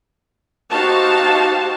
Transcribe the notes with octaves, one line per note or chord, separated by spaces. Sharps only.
D#4 F#4 G4 C5 F5 A5